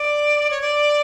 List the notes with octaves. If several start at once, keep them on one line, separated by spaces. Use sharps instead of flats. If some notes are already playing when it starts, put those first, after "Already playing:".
Already playing: D5
C#5
D5